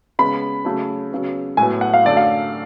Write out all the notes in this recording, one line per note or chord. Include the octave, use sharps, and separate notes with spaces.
C#3 G#3 B3 B5
C#3 F#3 A3
C#3 F#3 B3
A2 F#3 B3 G#5
F#5
F5
F#2 D3 F#3 A3 D5
F5